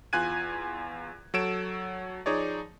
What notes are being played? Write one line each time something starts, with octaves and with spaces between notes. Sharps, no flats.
E2 F4 G#5 F#6 G#6 D#7
F#3 A4 C#5 E6 D7 E7
F3 D#4 G#4 C#5 D5